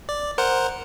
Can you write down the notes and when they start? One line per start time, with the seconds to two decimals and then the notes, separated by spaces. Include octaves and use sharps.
0.09 D5
0.38 A#4 C5 F#5